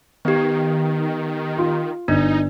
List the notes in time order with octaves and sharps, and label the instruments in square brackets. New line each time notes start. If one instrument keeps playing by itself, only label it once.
[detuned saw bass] D#3 [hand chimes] B3 G4
[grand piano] F4
[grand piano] G1 [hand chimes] D4 [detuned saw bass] D#4